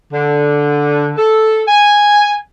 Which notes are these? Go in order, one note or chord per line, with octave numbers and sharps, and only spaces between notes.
D3
A4
G#5